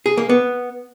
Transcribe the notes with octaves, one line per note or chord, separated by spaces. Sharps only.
G#4
A#3
B3